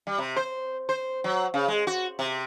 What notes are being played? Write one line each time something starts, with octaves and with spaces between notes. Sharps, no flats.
G3
C3
C5
C5
F#3
C#3
G#3
F#4
C3